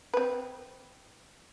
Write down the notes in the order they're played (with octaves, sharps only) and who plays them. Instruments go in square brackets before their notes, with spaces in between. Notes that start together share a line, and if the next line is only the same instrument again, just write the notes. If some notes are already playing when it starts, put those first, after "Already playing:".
[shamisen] C4 B4